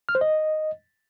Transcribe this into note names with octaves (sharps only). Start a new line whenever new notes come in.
F6
C5
D#5